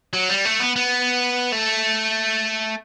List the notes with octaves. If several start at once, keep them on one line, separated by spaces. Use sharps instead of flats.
F#3
G3
A3
B3
B3
A3